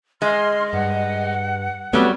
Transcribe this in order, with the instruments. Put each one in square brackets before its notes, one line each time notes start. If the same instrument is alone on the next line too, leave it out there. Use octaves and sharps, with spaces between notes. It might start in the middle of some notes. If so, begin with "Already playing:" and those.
[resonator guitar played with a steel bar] G#3 [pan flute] D#5 [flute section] C6 F6
[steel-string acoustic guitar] G2 [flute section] F#5
[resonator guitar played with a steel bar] F#3 G3 [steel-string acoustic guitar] A3 B3 [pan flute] C4